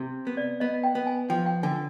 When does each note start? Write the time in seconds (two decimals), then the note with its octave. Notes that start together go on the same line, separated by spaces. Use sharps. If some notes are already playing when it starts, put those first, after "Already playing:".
Already playing: C3
0.27 B3
0.37 D5
0.60 B3 D#5
0.84 G5
0.95 B3
1.07 G#5
1.30 F3 G5
1.46 G5
1.63 D3 G#5